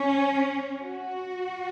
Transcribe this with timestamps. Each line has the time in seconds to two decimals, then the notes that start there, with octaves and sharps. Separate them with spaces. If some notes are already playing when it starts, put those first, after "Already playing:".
Already playing: C#4
0.84 F#4